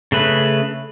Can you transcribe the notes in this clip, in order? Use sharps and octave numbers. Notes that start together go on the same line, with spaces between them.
C#3 A3 B4